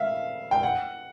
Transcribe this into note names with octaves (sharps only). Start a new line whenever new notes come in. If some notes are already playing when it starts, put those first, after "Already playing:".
Already playing: E5 F5
G5
F#5